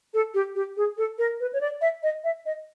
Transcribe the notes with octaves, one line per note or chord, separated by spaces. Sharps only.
A4
G4
G4
G#4
A4
A#4
B4
C#5
D5
E5
D#5
E5
D#5